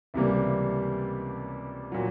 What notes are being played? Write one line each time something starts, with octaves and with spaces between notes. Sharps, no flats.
C#2 C3 E3 G3 A#3
A#2 F#3